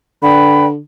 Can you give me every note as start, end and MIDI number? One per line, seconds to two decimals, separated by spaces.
0.23 0.78 50
0.23 0.66 71
0.23 0.66 74
0.23 0.66 79
0.23 0.66 83